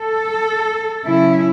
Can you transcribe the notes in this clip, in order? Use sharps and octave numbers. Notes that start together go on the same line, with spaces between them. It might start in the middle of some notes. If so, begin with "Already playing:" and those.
Already playing: A4
C#3 F#3 C#4 E4